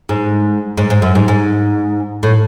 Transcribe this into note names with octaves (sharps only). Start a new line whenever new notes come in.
G#2
G#2
G#2
F#2
G#2
G#2
A2